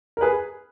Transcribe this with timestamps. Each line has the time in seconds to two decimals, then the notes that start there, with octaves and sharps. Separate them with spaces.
0.17 A#4
0.21 G#4 B4